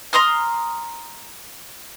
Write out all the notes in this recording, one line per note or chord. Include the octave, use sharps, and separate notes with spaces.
A#5 C6 D#6 F6